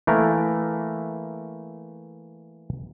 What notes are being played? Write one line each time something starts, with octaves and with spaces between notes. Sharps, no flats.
E3 A3 A#3 A#4